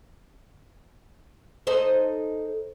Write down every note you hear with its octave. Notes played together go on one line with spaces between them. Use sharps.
D#4 A4 C5